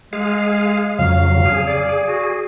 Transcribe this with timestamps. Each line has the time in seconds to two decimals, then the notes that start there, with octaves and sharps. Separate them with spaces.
0.13 G#3 G#4 F5
0.99 F2 C#3 F#3 F5
1.46 G#4
1.67 D5
2.08 F#4